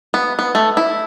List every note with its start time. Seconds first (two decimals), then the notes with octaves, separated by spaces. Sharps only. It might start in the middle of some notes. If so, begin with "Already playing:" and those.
0.14 B3
0.39 B3
0.55 A3
0.77 E4